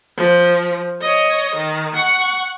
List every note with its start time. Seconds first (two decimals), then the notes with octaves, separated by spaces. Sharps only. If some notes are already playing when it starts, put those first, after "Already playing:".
0.17 F3
1.01 C#5 D#5
1.56 D#3
1.96 F#5 C#6